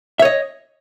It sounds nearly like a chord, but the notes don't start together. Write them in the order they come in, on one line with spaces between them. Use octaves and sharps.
E5 C#5 D#5